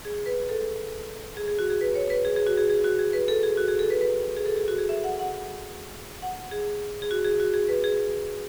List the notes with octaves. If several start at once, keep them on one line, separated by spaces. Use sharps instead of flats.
G#4
B4
A4
G#4
G#4
F#4
G#4
B4
C#5
B4
G#4
G#4
F#4
G#4
G#4
F#4
G#4
B4
A4
G#4
F#4
G#4
A4
B4
B4
G#4
A4
G#4
F#4
G#4
E5
F#5
F#5
F#5
G#4
G#4
F#4
G#4
F#4
G#4
B4
G#4